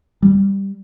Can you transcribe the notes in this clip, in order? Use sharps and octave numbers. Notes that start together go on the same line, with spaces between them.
G3